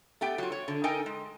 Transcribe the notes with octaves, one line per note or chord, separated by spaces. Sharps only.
A3 B3 G4 G5
F#3 F4
C#5
D3
D#4 A4 A#4 D#5 G5 G#5
G#3